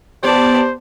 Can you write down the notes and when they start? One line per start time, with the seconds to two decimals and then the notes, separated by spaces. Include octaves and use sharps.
0.23 B3 G4 C5 D5 A5